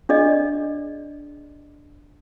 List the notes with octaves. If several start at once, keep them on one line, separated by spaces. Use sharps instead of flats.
D4 G#4 D5 D#5